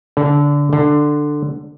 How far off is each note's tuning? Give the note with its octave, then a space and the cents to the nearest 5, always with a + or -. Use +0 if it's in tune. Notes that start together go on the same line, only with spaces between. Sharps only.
D3 -20
D3 +10